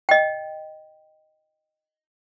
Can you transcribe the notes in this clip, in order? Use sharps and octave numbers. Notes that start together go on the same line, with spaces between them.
D#5 G5